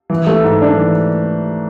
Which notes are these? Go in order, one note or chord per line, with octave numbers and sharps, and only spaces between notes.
E3
A3
G#2
D4
E3